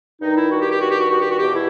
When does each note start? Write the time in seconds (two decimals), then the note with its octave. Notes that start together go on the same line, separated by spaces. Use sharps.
0.21 G2 D#3 D#4
0.37 E4
0.52 F#4
0.61 G4
0.72 G4
0.81 F#4
0.90 G4
1.00 F#4
1.10 F#4
1.21 G4
1.30 F#4
1.39 E2 B2 G4
1.55 E4